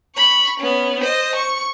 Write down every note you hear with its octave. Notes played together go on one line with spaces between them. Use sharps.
B5 C#6
B3 C#4
C5 D#5
C#6